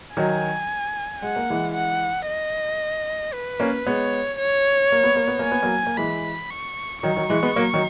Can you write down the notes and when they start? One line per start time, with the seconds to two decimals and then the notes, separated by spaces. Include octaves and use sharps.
0.17 D#3 F#3 G#5
1.22 G#3 F#5
1.36 A#3
1.50 E3 G#3
1.75 F#5
2.28 D#5
3.34 B4
3.60 A#3 C#4
3.86 G#3 B3 C#5
4.39 C#5
4.92 A#3
5.04 B3
5.16 A#3
5.27 B3
5.39 A#3
5.45 G#5
5.51 B3
5.63 F#3 A#3
5.87 A#3
5.97 E3 G#3 B5
6.51 C#6
7.03 D#3 F#3 C#6
7.16 D#3 F#3
7.30 E3 G#3
7.43 G#3 B3
7.56 F#3 A#3
7.74 D#3 F#3